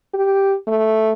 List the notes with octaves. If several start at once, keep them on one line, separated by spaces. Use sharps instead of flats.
G4
A3